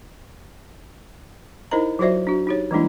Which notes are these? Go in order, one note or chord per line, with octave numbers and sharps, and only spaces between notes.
D#4 E4 A#4 C5 D#5 A#5
F#3 F4 F#4 C5 D5 E5
D4 F#4
D#4 G4 C#5
E3 G3 G#3 A#3 D4 E4